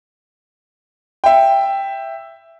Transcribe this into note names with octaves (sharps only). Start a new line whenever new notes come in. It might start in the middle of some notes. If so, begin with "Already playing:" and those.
E5 G5